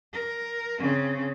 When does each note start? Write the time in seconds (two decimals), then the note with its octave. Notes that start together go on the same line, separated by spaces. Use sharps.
0.13 A#4
0.79 C#3 C4